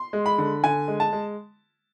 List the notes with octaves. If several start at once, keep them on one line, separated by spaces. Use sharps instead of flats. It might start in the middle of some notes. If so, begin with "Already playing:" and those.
Already playing: C6
G#3
B5
D3
D3 G#5
G#3
A5
G#3